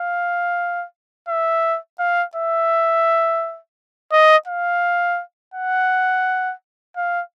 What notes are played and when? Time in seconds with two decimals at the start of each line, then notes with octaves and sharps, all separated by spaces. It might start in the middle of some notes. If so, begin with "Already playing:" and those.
Already playing: F5
1.28 E5
1.99 F5
2.35 E5
4.12 D#5
4.48 F5
5.54 F#5
6.97 F5